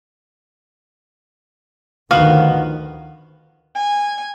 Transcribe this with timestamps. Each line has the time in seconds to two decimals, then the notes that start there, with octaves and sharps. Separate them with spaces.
2.11 D2 D#3 F3 B3 F#4 F5
3.75 G#5